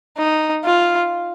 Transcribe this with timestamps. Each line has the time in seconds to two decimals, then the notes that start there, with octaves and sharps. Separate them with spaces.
0.18 D#4
0.65 F4